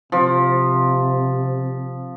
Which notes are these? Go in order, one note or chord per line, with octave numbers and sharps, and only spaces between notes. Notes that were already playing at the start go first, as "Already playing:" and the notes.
C3 F3